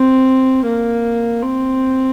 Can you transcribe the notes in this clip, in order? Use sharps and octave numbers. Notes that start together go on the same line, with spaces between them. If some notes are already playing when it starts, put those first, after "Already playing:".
Already playing: C4
A#3
C4